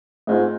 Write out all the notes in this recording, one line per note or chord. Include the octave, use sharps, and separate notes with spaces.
G#2 A3 C4 F4